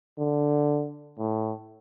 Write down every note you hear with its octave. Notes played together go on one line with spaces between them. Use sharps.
D3
A2